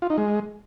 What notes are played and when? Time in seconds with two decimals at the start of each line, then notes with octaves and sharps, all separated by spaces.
0.02 F4
0.10 D#4
0.18 G#3